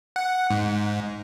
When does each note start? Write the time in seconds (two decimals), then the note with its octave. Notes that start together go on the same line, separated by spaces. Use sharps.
0.16 F#5
0.50 G#2